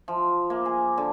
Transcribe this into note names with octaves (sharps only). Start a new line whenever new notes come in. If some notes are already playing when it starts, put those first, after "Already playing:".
F3
A#3
G#4
D3